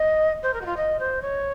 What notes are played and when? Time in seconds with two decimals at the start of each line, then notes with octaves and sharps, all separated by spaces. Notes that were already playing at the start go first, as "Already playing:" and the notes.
Already playing: D#5
0.43 C5
0.54 A#4
0.61 F#4
0.66 F4
0.77 D#5
1.00 C5
1.22 C#5